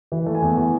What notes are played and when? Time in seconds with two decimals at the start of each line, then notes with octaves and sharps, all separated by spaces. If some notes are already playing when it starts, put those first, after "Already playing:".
0.12 E3
0.26 A3
0.35 G#5
0.42 E2
0.57 E3